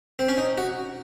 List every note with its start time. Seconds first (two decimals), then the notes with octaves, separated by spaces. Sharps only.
0.19 C4
0.29 C#4
0.37 D#4
0.58 F#4